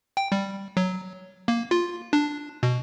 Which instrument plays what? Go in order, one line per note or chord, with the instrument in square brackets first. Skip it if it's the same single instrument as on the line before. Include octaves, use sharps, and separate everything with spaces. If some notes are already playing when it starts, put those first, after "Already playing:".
[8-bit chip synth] G5
G3
F#3
A#3
F4
D4
B2